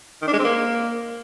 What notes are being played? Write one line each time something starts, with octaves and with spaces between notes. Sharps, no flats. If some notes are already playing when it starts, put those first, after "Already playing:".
D#3
D4
G#3
C4
A#3